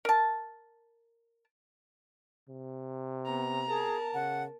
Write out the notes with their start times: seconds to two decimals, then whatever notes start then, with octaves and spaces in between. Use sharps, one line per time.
0.05 A#4 A5
2.49 C3
3.26 B3 A#5
3.68 G#4 A#4 A5
4.14 C#3 F#5